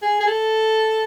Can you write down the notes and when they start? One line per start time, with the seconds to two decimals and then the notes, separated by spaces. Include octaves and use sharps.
0.02 G#4
0.21 G#4
0.27 A4